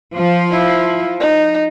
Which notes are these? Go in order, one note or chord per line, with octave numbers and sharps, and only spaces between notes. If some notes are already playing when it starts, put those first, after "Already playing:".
F3
E4
D#4